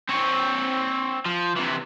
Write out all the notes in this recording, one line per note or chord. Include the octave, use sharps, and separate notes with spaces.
C4 C#5
F3
C3 E3